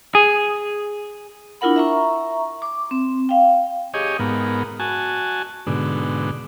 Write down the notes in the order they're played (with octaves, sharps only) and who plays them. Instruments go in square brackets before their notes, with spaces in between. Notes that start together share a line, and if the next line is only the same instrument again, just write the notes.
[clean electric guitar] G#4
[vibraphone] D4 E4 F4 A#4 F#5 B5
E5 A#5 C#6
D6
C4
F5 G5
[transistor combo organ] G4 G#4 C#5 D#5
G#2 B3 A#4
F#4 G#5 A5
G#2 B2 D3